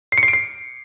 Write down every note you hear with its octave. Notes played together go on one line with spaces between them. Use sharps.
C7
C#7
C7
D7
C7